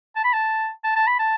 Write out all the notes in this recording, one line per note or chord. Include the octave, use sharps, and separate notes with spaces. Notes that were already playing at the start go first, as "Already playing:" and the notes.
A5
B5
A5
A5
A5
B5
A5